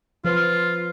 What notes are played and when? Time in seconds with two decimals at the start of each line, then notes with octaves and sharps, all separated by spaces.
0.25 F3 F4 B4 C5